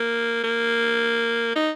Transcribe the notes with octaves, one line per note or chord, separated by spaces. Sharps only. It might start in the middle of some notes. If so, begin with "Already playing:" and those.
Already playing: A#3
A#3
D#4